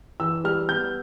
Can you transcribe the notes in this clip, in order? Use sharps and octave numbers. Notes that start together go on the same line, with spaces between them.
E3 E6
G3 F6
B3 G6